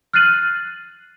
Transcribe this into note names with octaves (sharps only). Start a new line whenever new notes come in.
F6 F#6 A6 C7 D#7 F#7